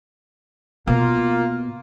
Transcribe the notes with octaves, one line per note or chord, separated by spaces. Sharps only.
B2 A#3 F4